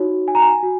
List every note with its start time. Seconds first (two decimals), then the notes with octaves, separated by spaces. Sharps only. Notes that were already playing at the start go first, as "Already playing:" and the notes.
Already playing: D#4 F#4 C#5
0.28 G#5
0.35 A#5
0.42 G#5
0.63 F#4